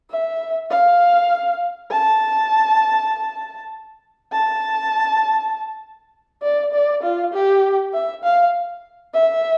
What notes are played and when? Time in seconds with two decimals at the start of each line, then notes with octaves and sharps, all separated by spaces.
0.11 E5
0.70 F5
1.91 A5
4.32 A5
6.42 D5
6.73 D5
7.03 F4
7.33 G4
7.93 E5
8.24 F5
9.14 E5